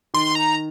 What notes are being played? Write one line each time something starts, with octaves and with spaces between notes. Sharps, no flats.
D#3 C6
A#5